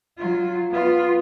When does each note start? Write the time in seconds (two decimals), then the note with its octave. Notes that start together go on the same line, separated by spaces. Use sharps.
0.18 F#3 F4
0.71 B3 F4